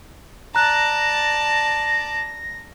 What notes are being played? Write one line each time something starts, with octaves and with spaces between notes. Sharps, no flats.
D5 A5 A#5 F#6 A#6